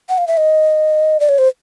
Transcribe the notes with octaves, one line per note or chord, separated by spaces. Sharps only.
F#5
F5
E5
D#5
D5
C#5
C5